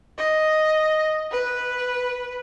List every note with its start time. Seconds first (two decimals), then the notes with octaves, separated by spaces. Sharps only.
0.18 D#5
1.31 B4